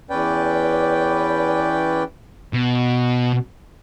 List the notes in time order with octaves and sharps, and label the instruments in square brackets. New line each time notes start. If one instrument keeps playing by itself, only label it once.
[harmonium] E2 C#4 B4 D5 G5
[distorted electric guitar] B2